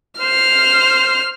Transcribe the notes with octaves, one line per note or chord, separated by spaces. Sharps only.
C5 F6